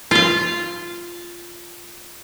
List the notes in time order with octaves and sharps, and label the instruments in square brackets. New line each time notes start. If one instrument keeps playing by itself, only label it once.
[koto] F4 F5